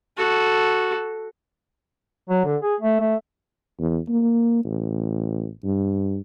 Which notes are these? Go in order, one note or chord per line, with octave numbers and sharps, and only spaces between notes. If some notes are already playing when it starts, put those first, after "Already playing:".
F#4 A4
F#3
D3
G#4
A3
A3
E2
A#3
A1
G2